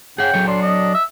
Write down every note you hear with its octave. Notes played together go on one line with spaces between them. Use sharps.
C#3 G#4 F#5 G5
F#3 A4 C#5
D4 C6
D#5
E5